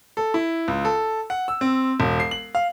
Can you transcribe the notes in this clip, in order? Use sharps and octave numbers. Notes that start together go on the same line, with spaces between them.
A4
E4
C#2
A4
F#5
E6
C4
E1
C7
F#7
F5